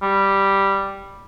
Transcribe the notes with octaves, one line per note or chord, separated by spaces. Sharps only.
G3